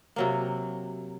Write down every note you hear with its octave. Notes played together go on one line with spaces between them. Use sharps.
C3 F#3 A#3